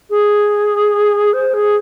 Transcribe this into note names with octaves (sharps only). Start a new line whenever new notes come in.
G#4
C5
G#4